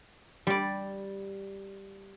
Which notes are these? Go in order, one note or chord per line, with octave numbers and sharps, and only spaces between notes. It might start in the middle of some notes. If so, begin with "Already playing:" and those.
G3 D5